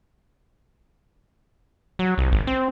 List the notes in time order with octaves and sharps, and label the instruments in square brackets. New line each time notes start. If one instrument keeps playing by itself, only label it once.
[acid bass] F#3
C2
G#1
C4